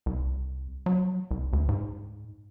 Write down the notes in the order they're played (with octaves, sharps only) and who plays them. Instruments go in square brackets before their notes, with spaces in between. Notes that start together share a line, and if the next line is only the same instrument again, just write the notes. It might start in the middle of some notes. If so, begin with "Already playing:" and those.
[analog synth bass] C2
F#3
C2
D2
G#2